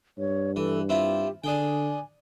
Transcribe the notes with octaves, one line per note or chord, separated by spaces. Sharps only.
G2 C#5
E3 A4
C4 E4 F4 G4
D3 D4 G#4 G5 G#5